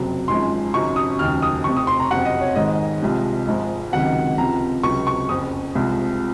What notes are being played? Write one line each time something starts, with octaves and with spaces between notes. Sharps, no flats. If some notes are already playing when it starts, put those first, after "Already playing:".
Already playing: F#1 F2 C3 F#3
G#1 F#2 F3 G#3 C6
G#1 F#2 C#3 F#3 C#6
D#6
F1 D#2 C#3 F#3 F6
D#6
F1 F2 C3 C#6
D#6
C6
A#5
F#1 F2 C3 F#3 F#5
D#5
C#5
G#1 G#2 D#3 G#3 D#5
C2 C3 F3 G#3
G#1 G#2 F3 G#3
C#2 C3 D#3 F#3 F#5
C#2 C3 F3 A#5
C#2 C3 F#3 C#6
C#6
F#1 F2 C#3 D#6
C2 C3 F3 G#3